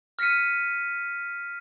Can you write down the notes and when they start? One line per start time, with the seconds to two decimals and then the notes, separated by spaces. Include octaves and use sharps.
0.19 F6 A#6 B6 C#7 D#7